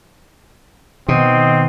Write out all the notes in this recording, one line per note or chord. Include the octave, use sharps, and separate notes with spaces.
B2 D#3 C4 D#5